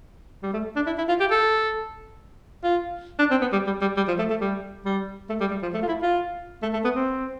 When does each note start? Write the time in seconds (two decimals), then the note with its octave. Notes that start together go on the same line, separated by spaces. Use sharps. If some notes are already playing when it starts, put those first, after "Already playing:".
0.43 G3
0.53 A3
0.76 D4
0.86 E4
0.98 E4
1.09 F4
1.20 G4
1.31 A4
2.64 F4
3.19 D4
3.31 C4
3.41 B3
3.52 G3
3.67 G3
3.81 G3
3.97 G3
4.08 F3
4.19 A3
4.30 A3
4.41 G3
4.85 G3
5.29 A3
5.41 G3
5.51 G3
5.62 F3
5.74 A3
5.82 F4
5.88 E4
6.03 F4
6.63 A3
6.73 A3
6.84 B3
6.95 C4